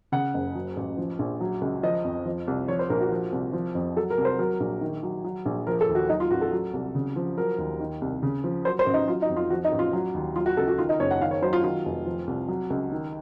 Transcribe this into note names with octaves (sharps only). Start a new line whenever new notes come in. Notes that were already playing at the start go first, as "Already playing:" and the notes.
C#3 F#5
F#1
F#3
A1
F3
A#1
F#3
C#2
F3 D#5
F2
F3
C2
F3 C#5
C5
A#1 A#4
F#4
F3
C2
F3
F2
F#3 A4
A#4
C2
C5
F#3 A#4
A#1
D#3
F#3
F#3
A#1
F3 A#4
A4
D#2
F#4
F#3 D#4
F4
A1 F#4
A4
F#3
C2
C#3
F3
F#3 A#4
D#2
D#3
C2
C#3
F3
F#3 C5
C5
A1
D#4
F#3 F4
D#4
F2
F4
F3 F#4
D#4
A1
F4
F#3
D#2
F#3 F4
F#4
C#2 A4
F#4
D#3 F4
D#4
F#1 C#5
F#5
D#3 F5
C#5
F#3 C5
F4
D#3 F4
F1
F3
C2
F#3
C#2
D#3